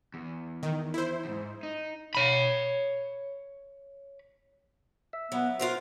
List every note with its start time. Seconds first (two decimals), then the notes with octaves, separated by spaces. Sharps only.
0.14 E2
0.63 D#3
0.94 E4 C5
1.25 E2 G#2
1.63 D#4
2.15 C#5 B5
5.13 E5
5.32 F#3 B3
5.59 F4 F#4 A#4 C5